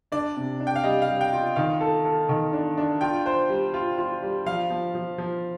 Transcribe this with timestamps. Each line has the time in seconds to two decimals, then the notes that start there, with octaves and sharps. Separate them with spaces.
0.12 D4 D5
0.36 C3
0.60 D4
0.67 G5
0.76 F5
0.84 G3 D#5
1.02 F5
1.08 G3
1.21 G5
1.33 F4
1.56 D#3 F5
1.81 A4
2.05 A4
2.29 D#3
2.53 D4
2.77 D4
3.01 F4 G5
3.26 C5
3.49 G3
3.74 F4
3.98 F4
4.22 G3
4.46 F3 F5
4.70 F3
4.95 F3
5.18 F3